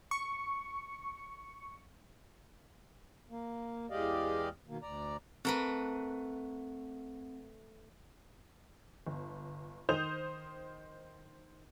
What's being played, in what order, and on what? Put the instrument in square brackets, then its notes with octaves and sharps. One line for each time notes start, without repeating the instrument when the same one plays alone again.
[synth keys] C#6 C#7
[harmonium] A#3
E2 G#3 G4 D5 D#5 F5
B2 D#3 A#3
D2 D5 A#5
[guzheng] A3 A#4 B4 [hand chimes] C4
[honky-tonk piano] G1
D#3 C5 D#6 G6 F7